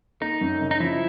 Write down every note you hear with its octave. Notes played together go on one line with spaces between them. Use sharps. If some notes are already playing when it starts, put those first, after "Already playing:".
A#3 D#4
F#2
C#3
D#4
F3 E4